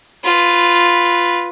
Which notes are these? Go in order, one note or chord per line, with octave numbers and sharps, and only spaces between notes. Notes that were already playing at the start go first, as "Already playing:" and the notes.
F4 B4